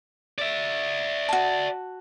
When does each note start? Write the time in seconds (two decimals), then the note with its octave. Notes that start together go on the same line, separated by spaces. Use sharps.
0.39 D5 E5
1.29 F#4 A5